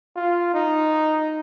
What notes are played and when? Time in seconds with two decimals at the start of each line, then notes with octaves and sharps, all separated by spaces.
0.16 F4
0.54 D#4